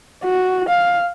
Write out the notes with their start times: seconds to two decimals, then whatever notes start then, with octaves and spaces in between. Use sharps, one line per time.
0.24 F#4
0.69 F5